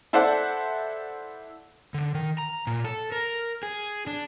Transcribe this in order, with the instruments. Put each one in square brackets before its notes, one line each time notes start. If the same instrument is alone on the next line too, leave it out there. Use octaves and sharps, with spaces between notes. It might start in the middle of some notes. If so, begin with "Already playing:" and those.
[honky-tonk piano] E4 A4 C5 D5 F#5
[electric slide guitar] D3
D#3
A#5
A#2
A4
A#4
G#4
D4